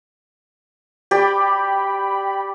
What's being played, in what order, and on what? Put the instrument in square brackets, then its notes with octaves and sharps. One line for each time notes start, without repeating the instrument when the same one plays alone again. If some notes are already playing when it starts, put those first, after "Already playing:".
[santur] G4 D5 [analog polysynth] G5 B5